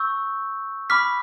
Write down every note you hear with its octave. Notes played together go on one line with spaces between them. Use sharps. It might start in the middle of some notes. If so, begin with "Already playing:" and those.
Already playing: C#6 E6 G6
B5 D6 F6 B6